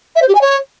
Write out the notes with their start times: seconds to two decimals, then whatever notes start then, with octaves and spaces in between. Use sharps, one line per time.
0.15 E5
0.22 C5
0.28 G4
0.35 G#5
0.41 C#5